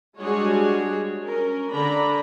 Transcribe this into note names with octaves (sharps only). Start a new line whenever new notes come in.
G3 G#3 D4 F#4 G#4 C#5
C#4 A#4
D3 D4 A#5 B5